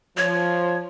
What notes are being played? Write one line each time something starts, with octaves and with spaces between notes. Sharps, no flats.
F3 C#5